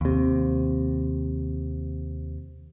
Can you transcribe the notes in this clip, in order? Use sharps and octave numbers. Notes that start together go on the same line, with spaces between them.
D#2 C3